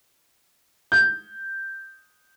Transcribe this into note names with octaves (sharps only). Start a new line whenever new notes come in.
G6